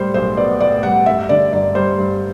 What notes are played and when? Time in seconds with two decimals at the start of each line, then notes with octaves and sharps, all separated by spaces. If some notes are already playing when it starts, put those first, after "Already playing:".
Already playing: A2 G3 C5
0.14 B1 C5
0.37 B3 D5
0.60 A2 D5
0.83 G3 F#5
1.06 G2 E5
1.29 D3 D5
1.53 G1 D5
1.75 G3 C5
1.98 G2